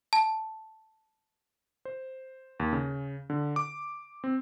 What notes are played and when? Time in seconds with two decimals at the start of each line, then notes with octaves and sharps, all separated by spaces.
0.13 A5
1.85 C5
2.60 D#2
2.73 C#3
3.30 D3
3.56 D6
4.24 C4